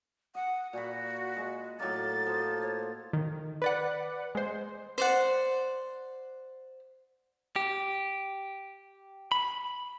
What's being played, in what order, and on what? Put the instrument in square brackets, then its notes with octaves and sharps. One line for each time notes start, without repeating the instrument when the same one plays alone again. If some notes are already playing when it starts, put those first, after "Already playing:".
[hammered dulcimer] D#5 [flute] F#5
[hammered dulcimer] A#2 B5 [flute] F#4
[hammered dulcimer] G#3
[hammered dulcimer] A2 F#3 A#3 [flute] A6
[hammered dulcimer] F3 C5
[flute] C#5
[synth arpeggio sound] D#3
B4 D5 F#5
G#3 C5
[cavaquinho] C5 D5 F#5
[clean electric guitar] G4
B5